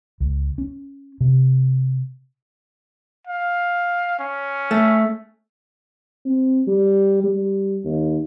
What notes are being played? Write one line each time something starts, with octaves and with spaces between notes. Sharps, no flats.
C#2
C#4
C3
F5
C#4
A3
C4
G3
G3
D#2